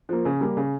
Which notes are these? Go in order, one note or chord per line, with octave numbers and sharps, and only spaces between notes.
F3 A#3
C#3
G3 A#3
C#3